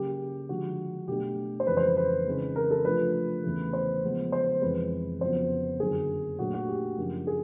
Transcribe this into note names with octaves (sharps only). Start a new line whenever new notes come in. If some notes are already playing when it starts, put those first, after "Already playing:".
Already playing: C#3 F#3 A#3 G4
D3 F3 G#3 F#4
B2 F#3 A3 D4 G4
C5
F2 C#3 E3 G#3 C#4 B4
C5
B4
B4
C#3 E3 G#3 C4 D#4
A#4
A4
C3 F3 A3 D4 F4 B4
E2 C#3 E3 A3
C5
C#3 F3 G#3 B3
C5
F2 C3 E3 G#3 C4 B4
F2 C#3 F#3 B3 C5
F#2 D3 F#3 A#3 G#4
A#2 F#3 A3 D4 F#4
F#4
G4
F#2 C#3 F3 A#3 D4
G#4